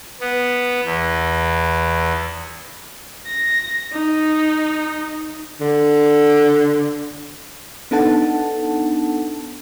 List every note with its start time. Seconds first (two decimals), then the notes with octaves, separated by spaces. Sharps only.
0.21 B3
0.85 E2
3.27 A#6
3.93 D#4
5.60 D3
7.91 B3 D4 D#4 A4 F#5 A5